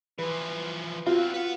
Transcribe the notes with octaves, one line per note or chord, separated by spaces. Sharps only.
E3 F3 B4
E2 C4 F4 F#4
B4 F#5